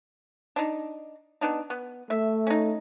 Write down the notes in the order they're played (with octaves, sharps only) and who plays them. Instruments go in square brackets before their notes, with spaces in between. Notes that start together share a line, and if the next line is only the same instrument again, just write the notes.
[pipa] D4 D#4
B3 D4 D#4
B3
[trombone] A3 [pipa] E5
[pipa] C#4 D#4